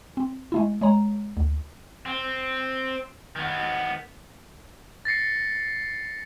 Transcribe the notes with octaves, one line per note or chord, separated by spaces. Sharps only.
C4
G#3 A3 E4
G#3 C#5 A#5
D2
C4
D#3 B3
A6 A#6 C7 C#7